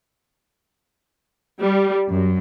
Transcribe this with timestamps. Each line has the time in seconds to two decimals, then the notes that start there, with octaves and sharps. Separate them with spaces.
1.62 G3
2.10 F#2